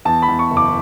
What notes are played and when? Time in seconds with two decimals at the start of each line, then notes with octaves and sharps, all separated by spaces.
0.05 E2 A5
0.22 B5
0.29 E2
0.39 C#6
0.50 F#1
0.57 D6